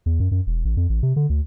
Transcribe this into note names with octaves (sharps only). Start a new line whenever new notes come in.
E2
F#2
F#2
E1
A1
F2
A1
C3
D3
D2